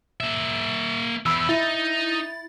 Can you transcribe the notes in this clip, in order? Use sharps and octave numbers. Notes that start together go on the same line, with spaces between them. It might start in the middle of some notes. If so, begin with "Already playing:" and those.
A#3 E5
E2 B5 E6
D#4 E4 A6